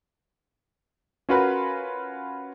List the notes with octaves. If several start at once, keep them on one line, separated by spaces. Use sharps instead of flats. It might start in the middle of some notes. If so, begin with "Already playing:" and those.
C#4 F4 F#4 A#4 B4